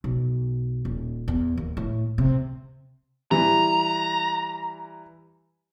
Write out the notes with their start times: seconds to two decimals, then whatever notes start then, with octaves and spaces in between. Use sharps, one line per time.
0.04 B1
0.85 D#1
1.28 E2
1.57 D#2
1.77 A2
2.18 C3
3.31 E3 G3 A#5